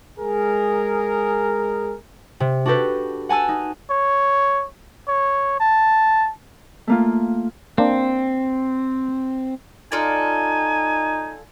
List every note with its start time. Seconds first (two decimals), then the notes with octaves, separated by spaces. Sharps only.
0.19 G#3 G#4 A#4
2.40 C3
2.66 D4 F#4 G4 A4 B4
3.29 F#5 G#5 A5 E6 D#7
3.48 D#4
3.90 C#5
5.08 C#5
5.60 A5
6.87 A3 A#3 F4
7.78 A#3 C4 D4
9.92 D#4 F4 A4 D5 G#5